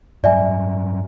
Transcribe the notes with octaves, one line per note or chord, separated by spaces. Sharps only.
G2 F#3 D5 E5 G#5